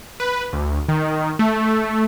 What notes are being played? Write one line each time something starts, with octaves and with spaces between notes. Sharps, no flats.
B4
D2
D#3
A3